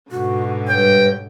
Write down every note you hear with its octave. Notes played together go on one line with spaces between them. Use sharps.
G#2 B2 D3 F#4
G2 C#5 G5